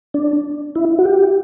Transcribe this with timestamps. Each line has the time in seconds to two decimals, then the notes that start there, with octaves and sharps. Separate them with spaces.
0.14 D4
0.76 E4
0.99 F#4
1.05 G4